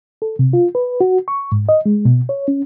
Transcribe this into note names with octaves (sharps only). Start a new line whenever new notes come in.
A4
C3
F4
B4
F#4
C#6
G#2
D#5
G#3
B2
C#5
C#4